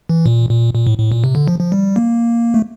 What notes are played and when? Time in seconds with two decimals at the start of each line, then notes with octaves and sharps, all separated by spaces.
0.09 E3
0.26 A#2
0.50 A#2
0.74 A#2
0.87 A2
0.98 A2
1.12 A#2
1.24 C3
1.35 D3
1.48 F3
1.60 F3
1.72 G3
1.96 A#3
2.54 A3